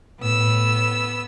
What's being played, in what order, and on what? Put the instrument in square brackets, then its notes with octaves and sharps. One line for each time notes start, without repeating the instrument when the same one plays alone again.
[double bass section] A2 [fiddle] B3 E6